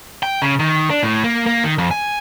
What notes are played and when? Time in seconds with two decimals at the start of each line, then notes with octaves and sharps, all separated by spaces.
0.23 G5
0.42 C#3
0.59 D#3
0.90 D4
1.03 A2
1.24 A#3
1.46 A#3
1.64 D#3
1.78 F2
1.91 G#5